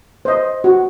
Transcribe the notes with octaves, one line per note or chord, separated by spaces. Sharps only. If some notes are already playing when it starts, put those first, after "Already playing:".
C5 D#5
F#4